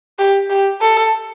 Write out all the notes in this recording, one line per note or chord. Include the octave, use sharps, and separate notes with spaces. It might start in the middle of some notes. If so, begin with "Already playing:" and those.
G4
G4
A4